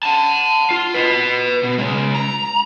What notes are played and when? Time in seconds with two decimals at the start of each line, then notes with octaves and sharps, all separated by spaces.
0.03 F#5 A5
0.71 F4
0.94 B4 D#5
1.63 B2
1.78 C#3 G#3
2.14 A#5